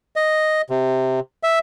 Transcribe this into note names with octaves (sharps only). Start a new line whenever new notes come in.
D#5
C3
E5